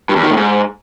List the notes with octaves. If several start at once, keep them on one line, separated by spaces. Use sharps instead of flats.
G2
E2
D#3
A2
G#2